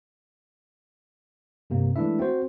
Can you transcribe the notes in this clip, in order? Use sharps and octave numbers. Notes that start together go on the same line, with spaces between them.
G2 C3 A#3
E3 G#3 A3 D4 E4 E5
C4 F#4 C5